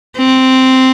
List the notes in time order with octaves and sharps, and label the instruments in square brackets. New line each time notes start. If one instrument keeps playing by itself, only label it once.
[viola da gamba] C4